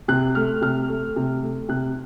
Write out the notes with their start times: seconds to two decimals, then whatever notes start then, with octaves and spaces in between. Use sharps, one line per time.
0.08 C3 F#6
0.35 A3 F6
0.62 C3 F6
0.88 A3
1.16 C3
1.43 A3
1.69 C3 F#6